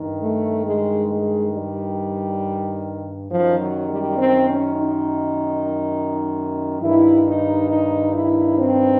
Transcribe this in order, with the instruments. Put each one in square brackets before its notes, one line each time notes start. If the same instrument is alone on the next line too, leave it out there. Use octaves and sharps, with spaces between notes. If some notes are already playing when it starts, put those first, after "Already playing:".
Already playing: [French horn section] G2 D#3
A3
G#3
G#3
G3
F#2 D#3 F3
F#3
G3
C4
C#4
D#4
G2 D#3 E4
D#4
D#4
E4
C4